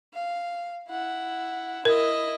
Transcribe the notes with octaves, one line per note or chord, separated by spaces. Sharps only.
F5
E4 F#5
E4 A#4 D#5